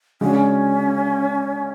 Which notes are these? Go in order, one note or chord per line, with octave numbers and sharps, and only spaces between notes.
C#3 G#3 C#4 D4 F#4